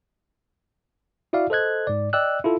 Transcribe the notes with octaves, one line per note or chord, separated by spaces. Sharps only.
E4 F#4 D5 E5 F5
A4 C5 D#5 F#6 G#6
G#2 D5
D5 D#5 G5 E6 F#6
E4 F4 A4